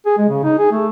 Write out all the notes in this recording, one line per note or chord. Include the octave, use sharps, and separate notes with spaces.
G#4
G#3
C#3
D#4
G#4
A3